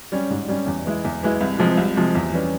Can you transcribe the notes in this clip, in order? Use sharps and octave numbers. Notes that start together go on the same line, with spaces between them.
G3 C#4
G#2
G3 C#4
E2
E3 G#3 E4
E2
E3 G#3 E4
C2
C3 F3 G#3
C2
C3 F3 G#3
E2
E3 G3 C#4